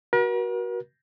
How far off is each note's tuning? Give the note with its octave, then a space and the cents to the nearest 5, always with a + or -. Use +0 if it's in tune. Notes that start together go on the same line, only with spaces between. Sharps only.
F#4 +10 A#4 +45